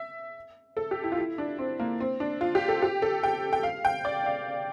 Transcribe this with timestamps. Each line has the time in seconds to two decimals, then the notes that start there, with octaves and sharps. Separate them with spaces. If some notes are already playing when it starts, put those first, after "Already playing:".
Already playing: E5
0.77 A4
0.91 G4
1.04 E4
1.12 F4
1.18 E4
1.38 D4
1.58 C4
1.80 A#3
2.00 C4
2.20 D4
2.41 F4
2.55 G4
2.68 A4
2.82 G4
3.02 A4
3.23 G5
3.53 G5
3.63 F5
3.85 G5
4.05 D5
4.26 F5